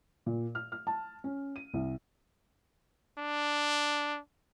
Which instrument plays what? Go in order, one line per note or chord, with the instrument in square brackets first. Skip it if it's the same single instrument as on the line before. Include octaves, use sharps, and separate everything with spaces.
[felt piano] A#2
F6
F6
A5
C#4
D#7
C2
[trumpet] D4